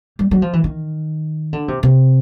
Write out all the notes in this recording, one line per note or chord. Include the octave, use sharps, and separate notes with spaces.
G3
F#3
F3
E3
D#3
D3
C3
C3